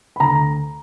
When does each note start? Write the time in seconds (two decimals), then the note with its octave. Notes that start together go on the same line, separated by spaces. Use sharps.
0.16 B5
0.20 D2 A#5